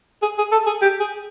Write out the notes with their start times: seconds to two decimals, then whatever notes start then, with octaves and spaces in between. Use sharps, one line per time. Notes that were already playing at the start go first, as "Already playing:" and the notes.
0.22 G#4
0.38 G#4
0.52 A4
0.66 G#4
0.82 G4
1.00 G#4